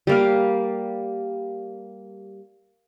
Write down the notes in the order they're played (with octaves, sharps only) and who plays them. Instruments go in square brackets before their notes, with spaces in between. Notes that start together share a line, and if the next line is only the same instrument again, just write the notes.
[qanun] G3 A#3 F5